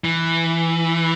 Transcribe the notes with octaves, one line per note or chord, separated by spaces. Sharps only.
E3